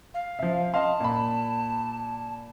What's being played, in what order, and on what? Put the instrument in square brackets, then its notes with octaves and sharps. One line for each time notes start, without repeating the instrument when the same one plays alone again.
[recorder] F5
[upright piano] F3 E5
[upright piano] D#5 F5 C6 [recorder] A5
[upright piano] A#2 B5